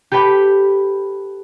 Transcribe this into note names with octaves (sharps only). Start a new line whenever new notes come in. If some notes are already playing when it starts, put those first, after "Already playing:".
G4 A4 B4 G5 B5 D6